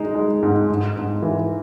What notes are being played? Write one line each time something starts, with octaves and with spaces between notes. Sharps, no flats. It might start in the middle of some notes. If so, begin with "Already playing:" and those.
Already playing: G#3 D#4
G#3
G#2
G#2
G#2
E3